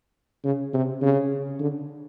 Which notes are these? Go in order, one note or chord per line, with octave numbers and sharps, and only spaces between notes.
C#3
C3
C#3
D3